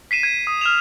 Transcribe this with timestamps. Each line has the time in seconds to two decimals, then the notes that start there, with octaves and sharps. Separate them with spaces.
0.11 B6 C7 D#7 E7
0.23 G#6 D#7
0.47 D#6
0.61 F6 E7 F7